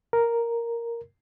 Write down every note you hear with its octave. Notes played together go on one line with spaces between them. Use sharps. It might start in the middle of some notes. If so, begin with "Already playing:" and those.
A#4